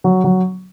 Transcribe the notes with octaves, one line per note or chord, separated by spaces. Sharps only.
F#3
F#3